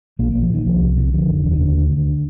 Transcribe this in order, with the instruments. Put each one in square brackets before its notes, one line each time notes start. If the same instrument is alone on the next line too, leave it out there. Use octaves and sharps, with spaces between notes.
[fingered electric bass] A#1 A#3
A#1 A#3
F3
A#2 D#3
C2 F3
C2
C3
D3 F3
F1 D#3
D#2 D3
D#3
D2 D3
D2
D3